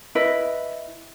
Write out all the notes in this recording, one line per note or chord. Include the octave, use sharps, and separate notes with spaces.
E4 B4 D#5